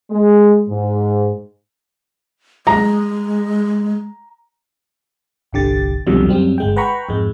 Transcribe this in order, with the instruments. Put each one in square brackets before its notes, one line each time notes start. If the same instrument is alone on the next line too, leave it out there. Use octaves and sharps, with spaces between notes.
[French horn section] G#3
G#2
[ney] G#3 [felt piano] A#5
[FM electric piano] G1 C2 D3 G4 A6
C2 F2 B2 D3 F#3 G3
F#2 F#3 G3 C4
G1 G#3 G5
B4 F#5 G5 A#5 B5 C#6
F2 G#2 G#3